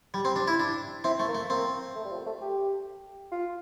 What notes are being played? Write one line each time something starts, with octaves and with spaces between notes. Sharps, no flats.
G3 G4
C4
D4
E4
D4
C4 E4
A3
A#3
A3
A#3 C4
A3
G3
F3
A3
G4
F4